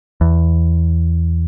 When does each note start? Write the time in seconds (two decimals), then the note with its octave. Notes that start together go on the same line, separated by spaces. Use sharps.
0.21 E2